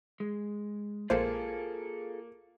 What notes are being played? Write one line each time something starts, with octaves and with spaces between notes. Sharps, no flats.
G#3
A#1 A#3 F4 G#4 A4 C5